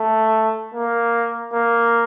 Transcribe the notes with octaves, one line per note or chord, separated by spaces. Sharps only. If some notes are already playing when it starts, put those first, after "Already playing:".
Already playing: A3
A#3
A#3